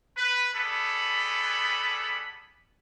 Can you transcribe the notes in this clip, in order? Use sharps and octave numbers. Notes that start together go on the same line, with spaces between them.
B4
G3 G#3 B3 A4 B5